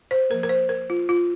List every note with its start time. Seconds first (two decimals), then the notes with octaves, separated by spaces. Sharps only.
0.11 C5
0.30 F3 A#3 A#4
0.43 A#4
0.49 C5
0.69 A#4
0.90 F4
1.09 F4